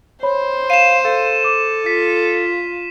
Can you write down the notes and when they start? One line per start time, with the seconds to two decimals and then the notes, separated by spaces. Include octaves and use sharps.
0.23 C5 C#5 B5
0.70 F5 D#7 E7
1.05 A4 F5
1.44 D6
1.86 F4 B6